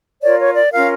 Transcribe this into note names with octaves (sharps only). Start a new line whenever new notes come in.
F4 A#4 C#5 D5
C#5
D5
C#4 F4 A#4 F5